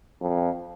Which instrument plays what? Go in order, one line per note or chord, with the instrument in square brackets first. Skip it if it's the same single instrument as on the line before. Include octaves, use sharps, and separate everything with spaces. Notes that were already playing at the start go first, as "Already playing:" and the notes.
[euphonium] F2